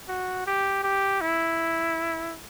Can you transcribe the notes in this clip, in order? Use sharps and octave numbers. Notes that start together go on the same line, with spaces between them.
F#4
G4
G4
E4